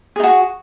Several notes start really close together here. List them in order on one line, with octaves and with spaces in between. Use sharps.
G#4 D#4 F#4